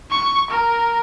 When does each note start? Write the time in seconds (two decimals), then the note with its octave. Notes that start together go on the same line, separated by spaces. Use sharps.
0.11 C#6
0.50 A#4